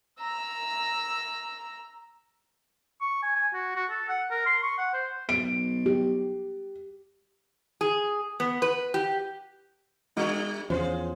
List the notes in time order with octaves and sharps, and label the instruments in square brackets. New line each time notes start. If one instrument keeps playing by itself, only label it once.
[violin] A#5 E6
[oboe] C#6
G#5
G#5
F#4
F#4
A4
F#5
A#4
C6
C#6
F#5
C5
[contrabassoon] B1 [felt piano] D7
[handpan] G4
[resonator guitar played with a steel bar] G#4
B3
B4
G4
[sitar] G3 D4 [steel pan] D#4 F#4
[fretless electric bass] E2 F3 C#4 [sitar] F4 G#4 [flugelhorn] C5